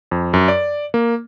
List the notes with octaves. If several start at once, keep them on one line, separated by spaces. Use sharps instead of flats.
F2
F#2
D5
A#3